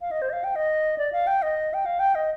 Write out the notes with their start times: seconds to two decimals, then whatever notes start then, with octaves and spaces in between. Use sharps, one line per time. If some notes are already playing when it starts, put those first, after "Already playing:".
0.01 F5
0.11 D#5
0.22 C5
0.29 D#5
0.33 F5
0.44 G5
0.55 D#5
0.98 D5
1.12 F5
1.27 G5
1.42 D#5
1.74 G5
1.85 F5
1.99 G5
2.15 D#5